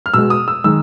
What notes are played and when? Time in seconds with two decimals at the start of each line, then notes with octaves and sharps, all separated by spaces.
0.06 F6
0.14 B2 G#3 E6
0.30 D#6
0.48 E6
0.64 D#3 G#3 E6